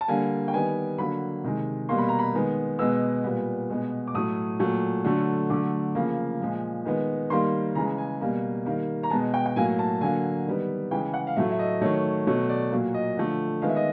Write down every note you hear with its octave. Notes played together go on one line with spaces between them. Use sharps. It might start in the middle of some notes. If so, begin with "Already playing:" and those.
A5
D3 G3 A#3 G#5
G5
D#3 G3 B3 G#5
D3 F#3 A#3 B5
C3 D#3 G#3
B2 G3 A#3 C6
B5
A#5
B5
D#3 G#3 B3
B2 G#3 B3 E6
A#2 G3 B3
B2 G#3 B3
D6
A2 F#3 A3 D#6
A#2 F#3 A3
D3 F#3 A3
D3 F#3 A3 D6
C#3 F3 A#3
A#2 F3 G#3
D#3 G#3 B3
D#3 G3 A#3 C6
C#3 E3 G#3 A#5
G#5
B2 G3 A#3
D#3 G3 A#3
A#5
B2 G#3 B3 A5
G5
G5
A2 F#3 A#3 G#5
A5
D3 F#3 A#3 G#5
D#3 G3 B3
C#3 E3 G#3 G5
F#5
F5
A2 F#3 A3 E5
E5
D#5
D#3 F#3 A3 C#5
B2 F#3 A3 C#5
D5
A#2 F#3 A#3
D#5
D3 F3 A3
D#3 G#3 B3 F5
E5
D#5